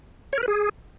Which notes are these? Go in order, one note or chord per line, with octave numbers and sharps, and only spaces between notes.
C#5
A#4
B4
G#4